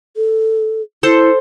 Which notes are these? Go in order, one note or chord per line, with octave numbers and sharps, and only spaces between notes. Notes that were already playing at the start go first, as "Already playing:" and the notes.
A4
E4 A4 C5